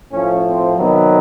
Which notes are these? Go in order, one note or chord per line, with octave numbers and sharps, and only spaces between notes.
A2 F3 C#4
C4
C3 D#3 F#3 B3